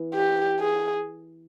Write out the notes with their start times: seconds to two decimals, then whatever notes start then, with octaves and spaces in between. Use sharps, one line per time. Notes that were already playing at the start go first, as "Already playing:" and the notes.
Already playing: E3 B3 E4
0.15 G4
0.60 G#4